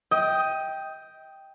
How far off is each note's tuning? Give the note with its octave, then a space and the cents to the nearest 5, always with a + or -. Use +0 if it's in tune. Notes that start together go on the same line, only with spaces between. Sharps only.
D#5 +35 G5 +0 D#6 +10